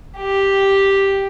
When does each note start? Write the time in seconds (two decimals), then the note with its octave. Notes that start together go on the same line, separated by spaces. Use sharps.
0.17 G4